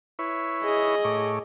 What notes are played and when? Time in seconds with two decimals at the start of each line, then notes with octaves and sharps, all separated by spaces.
0.19 E4 B4 C#5
0.63 G#4 D#5
1.04 A2 C#5 D6